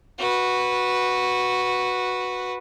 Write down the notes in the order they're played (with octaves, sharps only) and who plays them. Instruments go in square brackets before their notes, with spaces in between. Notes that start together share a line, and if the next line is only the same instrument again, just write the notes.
[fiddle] F#4 B4